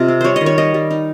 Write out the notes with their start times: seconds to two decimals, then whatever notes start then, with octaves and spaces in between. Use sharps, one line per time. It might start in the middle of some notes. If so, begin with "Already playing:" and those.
Already playing: C3 F4 D#5
0.08 C4
0.21 G3 C5 C#5
0.36 D#5
0.41 D#3
0.46 C#5
0.58 G3 D#5
0.74 G3
0.91 D#4